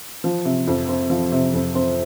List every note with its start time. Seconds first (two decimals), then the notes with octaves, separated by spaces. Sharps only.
0.24 F3
0.45 C3
0.67 F2
0.88 C4
1.10 F3
1.32 C3
1.54 F2
1.75 C4